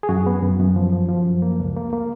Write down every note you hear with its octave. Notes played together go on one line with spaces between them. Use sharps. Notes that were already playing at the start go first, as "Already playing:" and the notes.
G#4
F#2 F#4
B3
F#2
F#2
F3
F3
F3
F#2
A#3
C#2
A#3
A#3